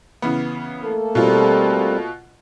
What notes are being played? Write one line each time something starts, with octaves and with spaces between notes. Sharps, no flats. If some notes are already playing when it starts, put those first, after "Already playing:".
C#3 E3 B3
A3 A#3 A4
B2 G3 C4 F4